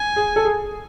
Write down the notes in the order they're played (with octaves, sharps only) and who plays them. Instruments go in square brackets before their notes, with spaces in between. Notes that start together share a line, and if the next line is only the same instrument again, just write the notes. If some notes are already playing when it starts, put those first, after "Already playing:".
Already playing: [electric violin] G#5
[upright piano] G#4
A4
G#4